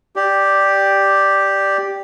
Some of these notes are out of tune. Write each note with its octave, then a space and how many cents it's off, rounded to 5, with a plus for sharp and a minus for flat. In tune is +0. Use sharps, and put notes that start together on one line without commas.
G4 +0 D5 +0